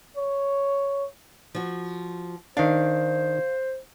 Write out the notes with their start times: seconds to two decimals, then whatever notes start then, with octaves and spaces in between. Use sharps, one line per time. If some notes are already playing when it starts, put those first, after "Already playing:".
0.17 C#5
1.55 F3 F#4
2.57 D#3 D4 C5 F5